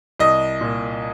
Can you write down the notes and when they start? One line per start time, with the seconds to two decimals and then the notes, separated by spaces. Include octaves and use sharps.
0.20 C2 D#5
0.61 A#2